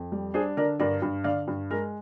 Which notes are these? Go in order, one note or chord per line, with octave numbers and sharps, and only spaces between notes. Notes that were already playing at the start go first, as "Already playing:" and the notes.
Already playing: F2
G3
D4 G#4 C5
D3 A#4 D5
G2 A#4 D5
G2
D3 D5 F5
G2
G#3 A#4